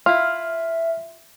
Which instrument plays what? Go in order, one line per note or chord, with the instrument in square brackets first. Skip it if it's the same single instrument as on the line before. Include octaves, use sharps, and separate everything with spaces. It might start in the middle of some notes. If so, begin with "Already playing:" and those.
[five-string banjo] E4 F4 [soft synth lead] E5 [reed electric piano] F6